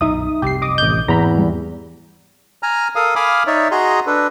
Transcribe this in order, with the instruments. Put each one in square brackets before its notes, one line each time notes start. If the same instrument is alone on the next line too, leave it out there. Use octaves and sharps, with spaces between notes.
[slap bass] B1 F#2 A#2 [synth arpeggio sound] D#4 E5 D#6
[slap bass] F1 C2 F#2 [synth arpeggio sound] G4 C7
[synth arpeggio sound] D#5 D6 D#6
[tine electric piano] A1 G6
[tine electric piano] E2 [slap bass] G#2 A#3 C4 [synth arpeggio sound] A#5 B5
[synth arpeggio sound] G3
[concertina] G#5 A#5 F6
A4 A#4 F5 D#6
F5 G#5 B5 D6 D#6 F6
D#4 C#5 D5 E5
F#4 G#4 D#5 A#5 C6
D4 A4 B4